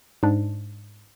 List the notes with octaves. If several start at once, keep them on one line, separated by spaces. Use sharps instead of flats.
G#2 D4